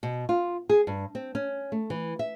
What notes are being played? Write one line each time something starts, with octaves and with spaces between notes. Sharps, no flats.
B2
F4
G#4
G2
C4
C#4
A3
E3
E5